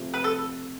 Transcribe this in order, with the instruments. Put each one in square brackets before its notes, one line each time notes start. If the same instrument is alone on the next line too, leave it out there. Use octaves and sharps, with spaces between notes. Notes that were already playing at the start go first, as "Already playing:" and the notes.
Already playing: [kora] C3 F3 A3
[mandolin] B4
A4